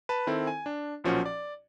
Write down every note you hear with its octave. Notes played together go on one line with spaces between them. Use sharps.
B4 A5
D#3 C4 E4 A4
G#5
D4
B1 A#2 F3 C#4 F#4 F#5
D5